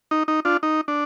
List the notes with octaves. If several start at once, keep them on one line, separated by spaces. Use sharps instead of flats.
D#4
D#4
D4 F4
D#4
D4